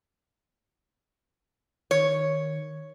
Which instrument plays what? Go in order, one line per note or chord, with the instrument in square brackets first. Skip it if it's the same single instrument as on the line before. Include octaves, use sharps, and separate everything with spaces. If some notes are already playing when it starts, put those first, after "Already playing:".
[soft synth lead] D#3 [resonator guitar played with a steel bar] C#5